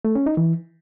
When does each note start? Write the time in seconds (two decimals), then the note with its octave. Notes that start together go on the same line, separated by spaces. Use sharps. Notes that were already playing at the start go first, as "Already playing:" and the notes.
0.05 A3
0.15 C#4
0.26 D#4
0.37 E3